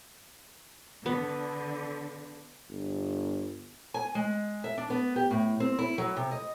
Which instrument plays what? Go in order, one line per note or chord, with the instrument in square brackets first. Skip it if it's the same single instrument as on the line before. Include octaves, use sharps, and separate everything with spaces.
[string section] D3 [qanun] B3
[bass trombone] G1
[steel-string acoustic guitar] G#5
G#3
E5
D4
B3
G4
A2
C4
E4
F#3
C3
D#5